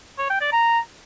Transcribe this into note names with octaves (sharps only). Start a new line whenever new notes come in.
C#5
G5
D5
A#5